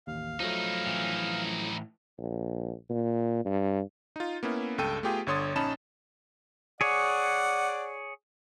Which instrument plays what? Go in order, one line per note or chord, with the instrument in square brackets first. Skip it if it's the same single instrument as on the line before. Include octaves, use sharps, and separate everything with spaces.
[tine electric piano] A1 D#2 [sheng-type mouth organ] F5
[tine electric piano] F3 F#3 A3 [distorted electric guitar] D#4 E4
[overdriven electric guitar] A2 E3
[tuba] A#1
A#2
G2
[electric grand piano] D#4 F4
A#3 B3 C#4 E4
C#2 G2 A4 G5 D#7
A3 B3 F4 G4 G#4 G5
G1 D3 C#5 C6 D#6 A6
A#1 C#4 D#4 A5 B5 E7
[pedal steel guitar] G#4 C#5 [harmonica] D5 F#5